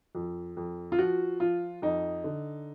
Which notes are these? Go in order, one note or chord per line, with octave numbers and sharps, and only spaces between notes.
F2
F2
F4
F3 F#4
F3 F4
F2 D#4
D3